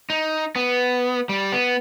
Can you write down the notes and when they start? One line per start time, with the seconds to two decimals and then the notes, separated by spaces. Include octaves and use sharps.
0.10 D#4
0.56 B3
1.29 G3
1.52 B3